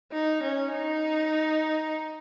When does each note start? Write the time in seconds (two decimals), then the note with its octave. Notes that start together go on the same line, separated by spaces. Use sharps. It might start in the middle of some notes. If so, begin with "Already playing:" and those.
0.12 D#4
0.43 C#4
0.73 D#4